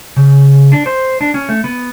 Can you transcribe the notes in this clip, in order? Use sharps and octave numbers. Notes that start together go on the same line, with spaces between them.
C#3
D4
C5
D4
C#4
A3
B3